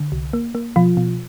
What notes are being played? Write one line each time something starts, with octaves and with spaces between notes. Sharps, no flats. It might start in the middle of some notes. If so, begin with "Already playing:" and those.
Already playing: D3
C2
A#3
A#3
B2 F3 F4
B2